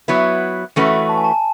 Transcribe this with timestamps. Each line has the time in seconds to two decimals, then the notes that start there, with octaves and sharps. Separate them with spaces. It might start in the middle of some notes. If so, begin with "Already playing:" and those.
0.08 F#3 B3 E4 B4
0.76 E3 A3 C#4 F#4 B4
1.09 A5
1.17 G#5
1.24 A5